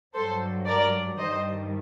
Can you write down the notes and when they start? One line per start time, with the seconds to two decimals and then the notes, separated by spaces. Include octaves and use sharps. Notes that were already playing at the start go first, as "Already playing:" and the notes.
0.15 G2 F#3 A4 C5
0.66 A#4 D5
1.18 G2 D#3 G3 C5 D#5